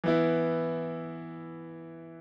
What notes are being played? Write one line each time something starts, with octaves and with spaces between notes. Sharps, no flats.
E3 B3 E4